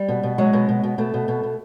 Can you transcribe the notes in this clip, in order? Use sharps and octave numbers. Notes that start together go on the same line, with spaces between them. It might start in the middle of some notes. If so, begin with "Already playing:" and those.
Already playing: G3
B2
B2
F#3 G#3
B2
B2
B2
B2 A3
B2
B2
B2